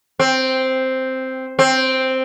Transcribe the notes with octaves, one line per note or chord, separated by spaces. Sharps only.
C4
C4